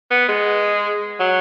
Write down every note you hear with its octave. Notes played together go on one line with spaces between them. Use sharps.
B3
G#3
F#3